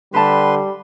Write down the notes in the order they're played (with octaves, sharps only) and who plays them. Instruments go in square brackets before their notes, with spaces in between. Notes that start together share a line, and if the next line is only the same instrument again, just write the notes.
[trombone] D3 [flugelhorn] G3 [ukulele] G4 A5 [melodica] B4 C6